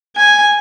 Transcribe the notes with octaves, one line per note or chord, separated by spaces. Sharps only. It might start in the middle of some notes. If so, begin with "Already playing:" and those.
G#5